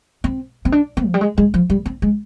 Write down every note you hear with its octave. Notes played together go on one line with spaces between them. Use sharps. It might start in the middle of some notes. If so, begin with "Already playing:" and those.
C4
C4
D4
C4
F3
G3
G#3
G#3
F3
G3
C4
G#3